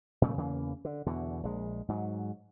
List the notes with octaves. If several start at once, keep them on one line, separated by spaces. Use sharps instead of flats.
A#2 C#3 G3 A3
E2 C#3 E3 A#3
D3
E2 B2 D3
A#1 G#3
G#2 F#3